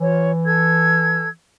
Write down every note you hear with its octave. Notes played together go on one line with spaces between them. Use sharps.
E3 F4 C#5
A4 E6 G#6